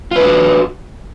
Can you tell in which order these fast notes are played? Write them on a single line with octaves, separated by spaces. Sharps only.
F4 B4 D4 F#4